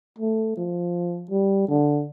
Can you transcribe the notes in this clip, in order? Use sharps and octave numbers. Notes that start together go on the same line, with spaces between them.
A3
F3
G3
D3